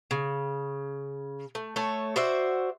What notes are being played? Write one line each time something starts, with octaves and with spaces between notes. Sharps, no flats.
C#3
A3
A3 A4 C#5
F#4 C5 D5 E5